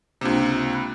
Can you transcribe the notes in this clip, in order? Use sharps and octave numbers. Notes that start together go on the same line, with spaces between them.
C#2 C3 A#3 D4 F4
B5 F#6